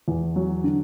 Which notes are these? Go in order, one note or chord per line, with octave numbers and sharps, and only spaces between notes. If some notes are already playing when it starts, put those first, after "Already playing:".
E2
F#3
D3